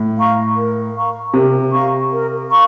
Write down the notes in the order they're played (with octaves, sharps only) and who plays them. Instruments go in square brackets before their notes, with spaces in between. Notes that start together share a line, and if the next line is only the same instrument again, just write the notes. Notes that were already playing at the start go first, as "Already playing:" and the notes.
Already playing: [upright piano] A2
[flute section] F5 A#5 C#6
A#4
F5 A#5 C#6
[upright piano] C3 [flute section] A#4
[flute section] F5 A#5 C#6
A#4
F5 A#5 C#6